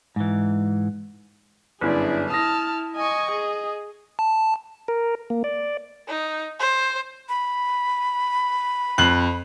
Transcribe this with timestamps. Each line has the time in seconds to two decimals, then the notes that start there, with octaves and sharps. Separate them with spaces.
0.16 G#2 E3
1.81 G1 F#2 D4 E4 G#4 D5
2.30 E4 A5 D#6 F6 A#6
2.96 D#5 G#5 C#6
3.32 G#4
4.19 A5
4.88 A#4
5.30 A#3
5.44 D5
6.08 D#4
6.60 C5
7.29 B5
8.98 F2 F#6 F#7